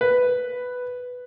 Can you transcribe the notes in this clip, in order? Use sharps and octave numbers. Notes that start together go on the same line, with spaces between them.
B4